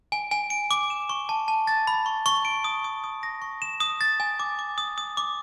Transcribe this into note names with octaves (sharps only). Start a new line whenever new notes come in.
G#5
G#5
D7
D6
E7
C#6
A5
A5
A6
B5
C#6
C#6
D7
D#6
D#6
D#6
A#6
C#6
E7
D#6
A6
G#5
D6
D6
D#6
D#6
D6